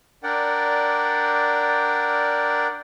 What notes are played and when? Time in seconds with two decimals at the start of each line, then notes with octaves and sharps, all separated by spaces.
0.23 D4 A#4 D5 F#5 G5